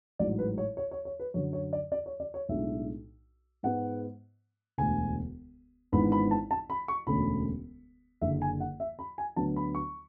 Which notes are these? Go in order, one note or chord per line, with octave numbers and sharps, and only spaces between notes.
A1 G#2 F#3 D5
B4
C#5
C#5
C#5
C#5
B4
F#2 D3 F#3 C#5
C#5
D5
D5
C#5
D5
C#5
B1 A2 G#3 D4 E5
G#2 G#3 B3 F#5
E1 D2 D3 G#5
G#1 G#2 E3 B3 D4 B5
B5
A5
A5
B5
C#6
E1 D2 D3 A3 C#4 B5
F#1 F#2 D3 E5
G#5
F#5
E5
B5
G#5
D2 D3 F#3 B3 D4 A5
B5
C#6